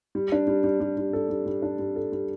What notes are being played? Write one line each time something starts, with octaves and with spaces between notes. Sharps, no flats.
G3
D4
G3
G3
G3
G3
A4
G3
G3
D4
G3
A4
G3